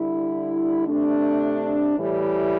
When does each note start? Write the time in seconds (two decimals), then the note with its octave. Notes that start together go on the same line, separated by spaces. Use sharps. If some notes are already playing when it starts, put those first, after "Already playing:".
Already playing: D3 G3 E4
0.87 C3 A3 D4
1.97 A2 E3 G3